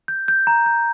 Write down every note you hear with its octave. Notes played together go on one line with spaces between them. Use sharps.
G6
G6
A#5
G6